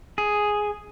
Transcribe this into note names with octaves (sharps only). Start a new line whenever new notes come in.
G#4